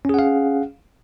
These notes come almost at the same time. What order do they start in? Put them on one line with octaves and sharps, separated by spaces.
C#4 G#4 F#5 F5